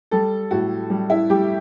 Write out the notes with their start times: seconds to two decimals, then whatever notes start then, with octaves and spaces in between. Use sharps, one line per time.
0.11 G3 A4
0.51 A2 F#4
0.90 G3
1.10 E4
1.30 G3 G4